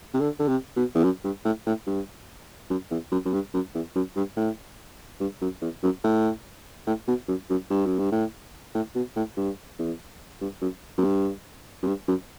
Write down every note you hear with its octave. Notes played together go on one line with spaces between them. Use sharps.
C3
D3
D3
C3
B2
E2
F#2
G2
A2
A2
G2
F#2
E2
F#2
F#2
G2
F#2
E2
F#2
G2
A2
G2
F#2
E2
F#2
A2
A2
B2
F#2
F#2
G2
F#2
G2
A2
A2
B2
A2
G2
E2
G2
F#2
F#2
G2
F#2
G2
F#2